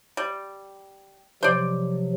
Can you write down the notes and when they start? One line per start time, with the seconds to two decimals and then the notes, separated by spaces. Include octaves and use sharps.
0.17 G3
1.43 C3 F3 F#3 C5 D5